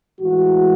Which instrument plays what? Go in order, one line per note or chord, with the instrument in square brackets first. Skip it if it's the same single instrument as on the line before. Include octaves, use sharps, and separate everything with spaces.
[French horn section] A2 E3 G#3 F#4